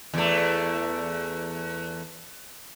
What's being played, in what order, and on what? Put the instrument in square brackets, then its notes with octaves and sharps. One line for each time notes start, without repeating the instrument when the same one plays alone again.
[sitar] E2 A3